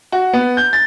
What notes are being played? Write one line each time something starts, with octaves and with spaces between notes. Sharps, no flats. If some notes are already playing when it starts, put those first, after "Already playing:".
F#4
B3
G6
A6